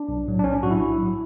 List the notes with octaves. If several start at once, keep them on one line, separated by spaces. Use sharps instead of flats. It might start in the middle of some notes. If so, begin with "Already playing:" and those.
Already playing: D4
B1
A2 F#3
D4
B1 C#4
D4
A2 F#3 F#4
E4
B1
F#3
A2